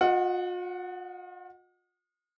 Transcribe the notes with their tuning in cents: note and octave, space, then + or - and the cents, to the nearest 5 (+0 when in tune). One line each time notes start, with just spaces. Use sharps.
F4 +45 D#5 +0 F#5 +0